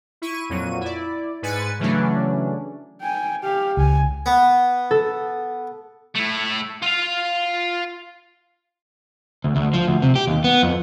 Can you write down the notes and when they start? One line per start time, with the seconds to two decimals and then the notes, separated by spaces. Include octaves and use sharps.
0.22 E4 C#6 D#7
0.49 F2 A#2 F#3 D#7
0.81 E4 D5
1.42 G#2 B4 G#5 A6 C#7
1.79 C#3 E3 F#3 A3 C#4 D4
3.01 G5 G#5
3.43 G4 F5
3.77 C#2 G#5
4.26 B3
4.91 A4
6.15 A3 E4
6.82 F4 F5
9.44 D2
9.56 D2
9.74 F3
9.87 D2
10.02 C3
10.16 G4
10.27 D#2
10.44 B3
10.63 F2